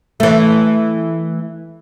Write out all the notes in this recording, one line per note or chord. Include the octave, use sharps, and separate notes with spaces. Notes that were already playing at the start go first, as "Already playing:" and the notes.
E3 A3